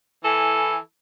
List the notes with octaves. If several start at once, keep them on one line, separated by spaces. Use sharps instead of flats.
E3 E4 A4 G#5